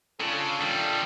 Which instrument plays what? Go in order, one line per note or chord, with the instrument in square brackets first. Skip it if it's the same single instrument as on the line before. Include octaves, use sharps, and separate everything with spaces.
[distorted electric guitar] C#3 [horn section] D4 F4 A4
[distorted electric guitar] D#3 G3